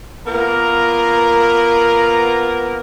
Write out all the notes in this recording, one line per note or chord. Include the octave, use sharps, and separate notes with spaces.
A#3 B3 F4 A#4